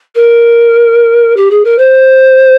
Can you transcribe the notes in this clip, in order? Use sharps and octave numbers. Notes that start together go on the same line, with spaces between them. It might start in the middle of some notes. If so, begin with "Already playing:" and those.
A#4
G4
G#4
A#4
C5